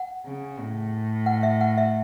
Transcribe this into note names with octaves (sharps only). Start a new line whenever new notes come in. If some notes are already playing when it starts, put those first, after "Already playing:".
Already playing: F#5
C#3
A2
F#5
E5
F#5
E5